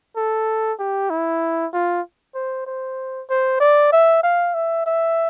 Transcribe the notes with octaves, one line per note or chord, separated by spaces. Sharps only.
A4
G4
E4
F4
C5
C5
C5
D5
E5
F5
E5
E5